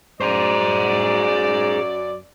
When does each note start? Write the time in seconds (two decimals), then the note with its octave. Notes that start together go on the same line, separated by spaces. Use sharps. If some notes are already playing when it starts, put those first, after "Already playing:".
0.21 F#2 G#4 C5 D5